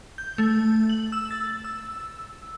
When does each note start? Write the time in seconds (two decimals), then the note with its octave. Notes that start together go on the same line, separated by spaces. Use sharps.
0.18 G6
0.38 A3
0.89 F#7
1.12 E6
1.31 A6
1.64 E6